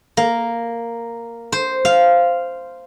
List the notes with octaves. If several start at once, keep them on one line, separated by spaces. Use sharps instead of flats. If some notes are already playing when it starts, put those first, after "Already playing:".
A#3
C5
F5